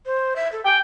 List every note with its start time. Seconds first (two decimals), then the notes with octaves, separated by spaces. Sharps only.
0.06 C5
0.36 E5
0.52 A4
0.65 G5 G#5